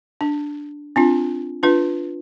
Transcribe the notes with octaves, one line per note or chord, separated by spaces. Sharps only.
D4
C4 D4 F4
D4 F4 B4